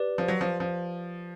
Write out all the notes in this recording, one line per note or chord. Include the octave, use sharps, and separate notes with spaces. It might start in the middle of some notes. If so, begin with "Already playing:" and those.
Already playing: G4 B4 D5
F3
F#3
F3
F3